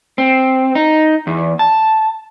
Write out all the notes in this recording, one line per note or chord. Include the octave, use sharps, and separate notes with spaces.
C4
D#4
E2
A5